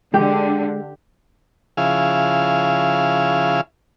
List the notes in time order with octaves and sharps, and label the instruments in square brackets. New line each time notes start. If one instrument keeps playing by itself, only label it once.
[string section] D3 [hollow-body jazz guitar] G#3 [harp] G4
[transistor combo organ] C#3 F3 E4 G#4 F5